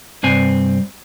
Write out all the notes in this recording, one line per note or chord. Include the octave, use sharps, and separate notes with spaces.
C2 G2 C4 G#5